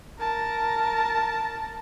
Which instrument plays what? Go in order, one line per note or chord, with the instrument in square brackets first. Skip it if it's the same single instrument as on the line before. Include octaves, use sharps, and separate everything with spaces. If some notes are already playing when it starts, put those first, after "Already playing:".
[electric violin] A#4 A5